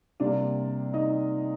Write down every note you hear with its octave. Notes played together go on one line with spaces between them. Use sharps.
C3 G3 A#3 D4 D5
D#4 D#5